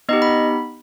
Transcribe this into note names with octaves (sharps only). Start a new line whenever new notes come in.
B3 D#4 G4 D#5
B5